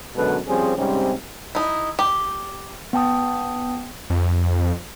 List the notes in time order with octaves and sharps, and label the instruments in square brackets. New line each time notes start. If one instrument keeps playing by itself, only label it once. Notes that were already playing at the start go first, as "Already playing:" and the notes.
[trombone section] F#2 B2 D3 G#3 A4 B4
F3 G3 C4 C#4 G#4
G#2 C3 G3 C4 C#4
[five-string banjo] D#4 E4
G4
[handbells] B3 G5 A5 D#6
[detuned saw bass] F2